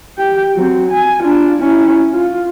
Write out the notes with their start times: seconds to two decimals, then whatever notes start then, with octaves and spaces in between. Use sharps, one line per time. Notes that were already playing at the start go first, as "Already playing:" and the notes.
0.18 G4 G5
0.56 F#3 C4
0.91 G#5
1.23 D4 F4
1.59 C#4 E4
2.13 F4